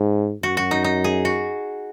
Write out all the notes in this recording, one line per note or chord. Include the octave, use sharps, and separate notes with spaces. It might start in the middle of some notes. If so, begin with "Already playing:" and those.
Already playing: G#2
F#2 F#4
F#4
D#4
D#4
G#4
F#4